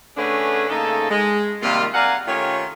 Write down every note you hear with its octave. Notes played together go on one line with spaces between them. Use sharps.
D3 A3 C#4 D4 G#4 B4
C#3 A3 A#3 D#4 A4
G#3
C3 D#3 G3 A#3 F4
A#4 D5 F5 F#5 G#5
D#3 A3 C#4 F4 G4 C#5